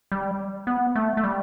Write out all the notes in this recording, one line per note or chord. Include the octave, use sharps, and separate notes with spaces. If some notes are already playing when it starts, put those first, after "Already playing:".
G3
B3
A3
A3
G3